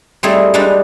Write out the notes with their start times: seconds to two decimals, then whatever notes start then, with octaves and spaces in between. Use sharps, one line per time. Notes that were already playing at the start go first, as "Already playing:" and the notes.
0.23 G3 A3 C4 D#4 E4 G#4
0.54 G3 G#3 D4 D#4 B4